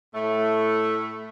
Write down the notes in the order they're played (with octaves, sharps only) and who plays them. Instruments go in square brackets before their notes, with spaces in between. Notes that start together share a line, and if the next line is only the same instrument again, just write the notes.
[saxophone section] A2 A3